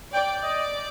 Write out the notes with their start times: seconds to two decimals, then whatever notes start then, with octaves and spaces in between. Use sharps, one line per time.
0.14 D5 G5
0.43 D#5